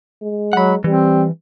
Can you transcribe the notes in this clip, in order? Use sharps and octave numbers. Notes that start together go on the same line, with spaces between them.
G#3
F#3 F#5 B5
E3 G3 C4